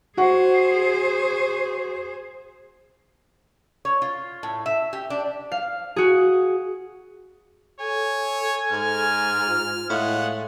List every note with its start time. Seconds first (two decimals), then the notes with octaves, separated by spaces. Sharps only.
0.17 F#4 G#4 C5 F#5
3.85 C#5
4.02 F4
4.43 A2
4.66 E5
4.93 G4
5.10 D4
5.52 F5
5.96 F#4 G#4
7.80 A4 C#5 G#5
8.72 G#2 F6
9.47 F4
9.90 A2 G#3 F5 F#5